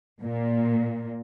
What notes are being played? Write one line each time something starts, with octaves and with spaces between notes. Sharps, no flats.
A#2